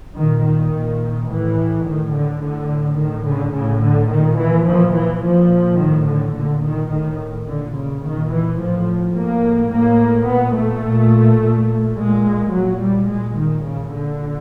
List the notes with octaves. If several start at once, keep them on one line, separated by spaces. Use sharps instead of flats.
A#2 D#3
D#3
A#2
A2 E3
A2 D#3
D3
A2 D3
A2 D#3
D3
A2 C#3
D3
A#2 D#3
E3
A#2 F3
E3
A#2 F3
A2 D#3
D3
A#2 D3
D#3
A2 D#3
A#2 D3
C#3
A#2 D#3
E3
A2 F3
A2 A#3
A2 A#3
A#2 B3
A3
A#2
A#2
A#2 G#3
A#2 F#3
G3
A#2 G#3
D#3
A#2 C#3
D3